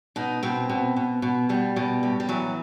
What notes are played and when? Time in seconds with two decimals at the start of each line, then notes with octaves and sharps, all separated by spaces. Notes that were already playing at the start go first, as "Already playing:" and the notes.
0.16 B2 D#4
0.43 B2 C4
0.69 B2
0.96 B2
1.22 B2
1.49 B2 G3
1.76 B2 G3
2.03 A2 G3
2.20 G3
2.29 E3 F#3